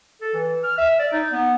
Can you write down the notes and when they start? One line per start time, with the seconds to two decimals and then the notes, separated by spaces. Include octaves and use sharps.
0.22 A4
0.34 E3
0.64 F6
0.78 E5
0.99 D5
1.12 D#4
1.32 B3